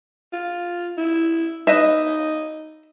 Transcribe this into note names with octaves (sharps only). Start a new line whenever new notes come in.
F4
E4
D#4 B4 D#5 E5